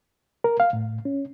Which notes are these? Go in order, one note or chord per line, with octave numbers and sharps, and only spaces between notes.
A#4
F5
A2
C#4